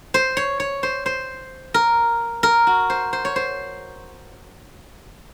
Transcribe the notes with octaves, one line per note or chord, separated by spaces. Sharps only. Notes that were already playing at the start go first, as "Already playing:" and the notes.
C5
C#5
C#5
C5
C5
A#4
A#4
F#4
C5
C5
C#5
C5